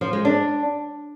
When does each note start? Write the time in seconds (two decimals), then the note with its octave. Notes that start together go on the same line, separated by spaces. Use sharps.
0.01 F3
0.13 G#3
0.25 D4